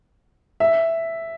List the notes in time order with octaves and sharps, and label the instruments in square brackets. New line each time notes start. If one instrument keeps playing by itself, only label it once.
[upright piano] E5